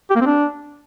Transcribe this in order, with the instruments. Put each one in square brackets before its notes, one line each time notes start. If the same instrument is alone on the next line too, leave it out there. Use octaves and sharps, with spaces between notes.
[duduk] G4
A#3
C4
D4